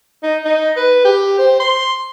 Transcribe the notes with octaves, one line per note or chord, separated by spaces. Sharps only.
D#4
D#4
B4
G4
C5
C6